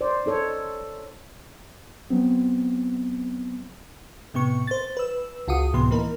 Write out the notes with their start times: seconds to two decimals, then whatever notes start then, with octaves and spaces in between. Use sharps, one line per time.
0.01 C5 D5
0.26 D#4 A4 C#5
2.10 F#3 B3 C4
4.34 A2 C3 B3 C#6
4.67 C5 A6
4.97 B4 E6
5.48 C#2 F4 F#4 D#6
5.73 C#2 A2 C3 E3 B3 C6
5.91 E3 A#3 D#4 A#4